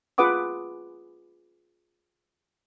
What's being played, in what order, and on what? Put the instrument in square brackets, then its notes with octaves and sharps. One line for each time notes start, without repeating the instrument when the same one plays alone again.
[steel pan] F4 G#4 B4 F#5 D6 D#6